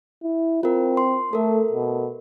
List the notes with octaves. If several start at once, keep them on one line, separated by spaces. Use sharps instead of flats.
E4
C4 F4 A#4
C6
A3 A4 A#4
B2